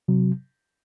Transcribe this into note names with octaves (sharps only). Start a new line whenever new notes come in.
C3 F#3